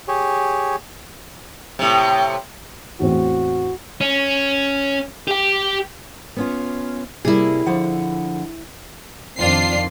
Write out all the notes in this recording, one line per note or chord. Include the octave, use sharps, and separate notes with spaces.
G4 G#4 C#5
A2 C3
E2 A2 C4 F#4
C#4
G4 G5
B3 C#4 F4
C3 G3 A#3 E4 G#4
D3 F3 F#5
F2 D#3 C4 D4 F4 C7